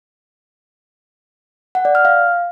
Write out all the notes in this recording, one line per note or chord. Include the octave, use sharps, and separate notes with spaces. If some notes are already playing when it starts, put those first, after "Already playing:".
F#5
D5
F6
F5